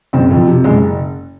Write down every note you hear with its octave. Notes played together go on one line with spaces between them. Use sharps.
F#1 C4
F2
C3
F#1 G#3